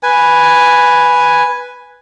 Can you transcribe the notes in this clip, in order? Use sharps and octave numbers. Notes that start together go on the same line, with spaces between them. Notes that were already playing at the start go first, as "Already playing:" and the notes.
B4 G#5